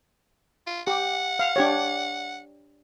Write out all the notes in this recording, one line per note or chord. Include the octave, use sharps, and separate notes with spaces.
F4
G4 F#5
F5
D4 G4 C#5